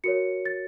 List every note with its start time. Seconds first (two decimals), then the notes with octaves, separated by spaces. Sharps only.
0.04 F#4 A#4 C#5 C#7
0.46 A6